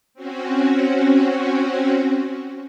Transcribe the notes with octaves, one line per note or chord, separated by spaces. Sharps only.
C4 C#4 F#4